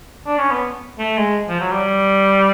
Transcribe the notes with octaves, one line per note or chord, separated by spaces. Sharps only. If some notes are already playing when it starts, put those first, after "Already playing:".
D4
C#4
B3
A3
G#3
F3
F#3
G3